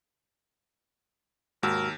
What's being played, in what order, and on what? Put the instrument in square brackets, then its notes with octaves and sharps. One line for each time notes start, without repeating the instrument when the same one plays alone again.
[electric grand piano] D#2 [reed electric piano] G#2 F#4 E6 [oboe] A#4